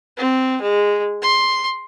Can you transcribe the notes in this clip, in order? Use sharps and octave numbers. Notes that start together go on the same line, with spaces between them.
C4
G#3
C6